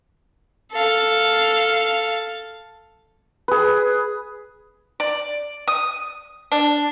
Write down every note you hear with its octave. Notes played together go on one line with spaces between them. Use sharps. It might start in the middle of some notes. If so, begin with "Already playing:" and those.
A4 F5
G#4 B4
D5
D#6
D4